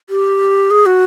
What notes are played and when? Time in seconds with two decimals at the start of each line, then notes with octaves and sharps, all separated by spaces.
0.10 G4
0.71 G#4
0.86 F#4